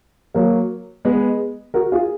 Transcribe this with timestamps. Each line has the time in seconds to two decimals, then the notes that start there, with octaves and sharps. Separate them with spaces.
0.34 F#3 A#3
1.05 G#3 B3
1.74 F#4 A#4
1.92 F4 G#4